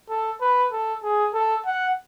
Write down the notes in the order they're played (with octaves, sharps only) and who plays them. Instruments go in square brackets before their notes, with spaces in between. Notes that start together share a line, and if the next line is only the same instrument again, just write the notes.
[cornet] A4
B4
A4
G#4
A4
F#5